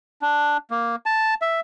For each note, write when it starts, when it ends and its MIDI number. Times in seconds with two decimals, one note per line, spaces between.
0.22 0.57 62
0.71 0.96 58
1.06 1.34 81
1.42 1.60 76